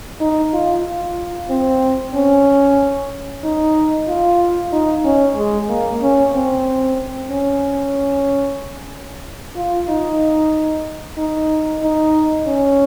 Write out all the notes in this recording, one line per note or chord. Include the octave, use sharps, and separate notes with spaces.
D#4
F4
F4
C4
C#4
D#4
F4
D#4
C#4
G#3
A#3
C#4
C4
C#4
F4
D#4
D#4
D#4
C#4